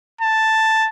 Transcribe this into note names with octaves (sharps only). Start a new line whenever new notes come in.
A5